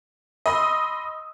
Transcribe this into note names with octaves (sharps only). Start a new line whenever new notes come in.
D#5 B5 C6 D#6 E6